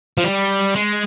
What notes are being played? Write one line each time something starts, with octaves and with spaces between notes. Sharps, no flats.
F3
G3
G#3